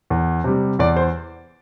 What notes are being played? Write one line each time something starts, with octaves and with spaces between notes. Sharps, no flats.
E2
C3 G3
E2 D5
C5